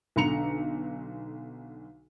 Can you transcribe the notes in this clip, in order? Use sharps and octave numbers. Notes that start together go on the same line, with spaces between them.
B1 D3 A#5 C#7 F7